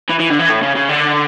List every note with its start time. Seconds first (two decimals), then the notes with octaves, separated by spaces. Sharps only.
0.09 E3
0.19 E3
0.30 D3
0.39 E3
0.49 A2
0.62 C#3
0.75 C#3
0.89 D3